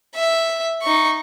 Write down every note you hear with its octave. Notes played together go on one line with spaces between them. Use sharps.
E5
D#4 C#6